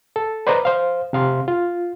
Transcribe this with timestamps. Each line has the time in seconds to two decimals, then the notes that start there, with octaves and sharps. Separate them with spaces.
0.16 A4
0.47 B4 C5 D5 D#5 A#5 B5
0.65 C5 F5
1.13 C3 F5 C6
1.48 F4